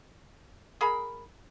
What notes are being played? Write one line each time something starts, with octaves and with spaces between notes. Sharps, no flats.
G#4 A#4 F5 B5